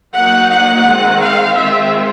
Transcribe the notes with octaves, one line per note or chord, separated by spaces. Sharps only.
F#3 A#3 D#4 F#5
F#5
D#3 G#3 C4
F5
D#3 G#3 C4 F4 E5